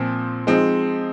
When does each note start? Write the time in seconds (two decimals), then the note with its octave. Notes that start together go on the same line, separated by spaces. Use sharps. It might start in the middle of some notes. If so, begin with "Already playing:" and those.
Already playing: A#2 F3 C4
0.47 F3 G#3 C4 D#4